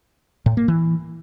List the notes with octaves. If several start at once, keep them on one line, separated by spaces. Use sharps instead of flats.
A2
A#3
E3